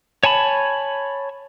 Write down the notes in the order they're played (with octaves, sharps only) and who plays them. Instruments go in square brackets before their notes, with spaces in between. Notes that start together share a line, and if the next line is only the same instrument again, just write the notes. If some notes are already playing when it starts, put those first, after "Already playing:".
[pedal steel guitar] C#5 G#5 A5 B5